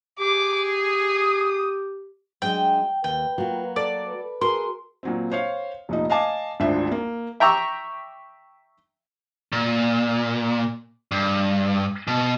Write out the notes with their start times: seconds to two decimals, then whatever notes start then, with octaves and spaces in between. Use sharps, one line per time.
0.20 G4 G#4 D6
0.72 D#6
2.42 F#3 G#3 D4 G5
3.04 D#2 B4 G5
3.38 F#3 A#3 F4
3.76 A4 D5
4.08 B4
4.41 F#4 G#4 A#4 C6
5.03 A#2 F#3 C4
5.31 C5 C#5 F5
5.89 F1 A#2 D#4
6.10 D#5 F5 G#5 A5 D6
6.60 G#1 D2 D4 F4 C5 E5
6.92 A#3
7.40 E5 G5 A#5 C#6 D6 E6
9.52 A#2
11.11 G2
12.08 B2